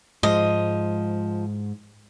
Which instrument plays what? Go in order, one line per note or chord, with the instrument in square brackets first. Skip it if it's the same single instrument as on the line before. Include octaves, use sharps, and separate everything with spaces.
[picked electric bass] G#2 G#3 [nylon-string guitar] F3 [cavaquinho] D#5